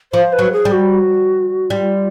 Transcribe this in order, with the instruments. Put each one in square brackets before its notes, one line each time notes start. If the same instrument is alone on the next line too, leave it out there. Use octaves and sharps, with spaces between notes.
[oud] F3 [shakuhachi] C5
[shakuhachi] B4
[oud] F#3
[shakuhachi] G#4
[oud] G3
[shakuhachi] F#4
[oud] G3 [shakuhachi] F4